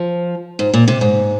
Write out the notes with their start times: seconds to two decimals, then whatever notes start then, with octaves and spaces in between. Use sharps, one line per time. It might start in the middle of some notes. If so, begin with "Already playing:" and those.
Already playing: F3
0.59 G#2
0.74 A#2
0.88 C3
1.01 G#2